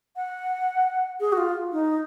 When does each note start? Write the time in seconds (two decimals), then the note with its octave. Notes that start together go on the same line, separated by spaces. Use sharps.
0.16 F#5
1.20 G#4
1.32 F#4
1.37 F4
1.72 D#4